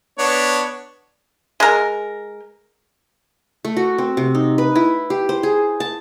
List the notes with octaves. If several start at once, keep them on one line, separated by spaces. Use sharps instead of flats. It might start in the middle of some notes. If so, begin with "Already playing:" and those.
B3 D4 C#5
G#3 A#4
A3
F#4
C4
C3
D#4
B4
E4
G4
C5
G#4
A5